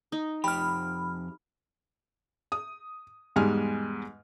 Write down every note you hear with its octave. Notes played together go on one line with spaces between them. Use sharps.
D#4
F2 G4 G5 B5 F6
D#6
E2 G#2 G3 G#3 G#5 F6